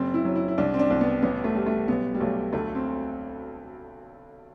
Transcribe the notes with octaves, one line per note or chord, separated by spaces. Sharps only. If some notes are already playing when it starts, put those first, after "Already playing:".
Already playing: F#1 C4
E4
F#3
E4
E4
C2 D4
C4
D4
C2
B3
A1 B3
A3
G3
A3
B1 B3
G3
B1 A3
D2 A3
C4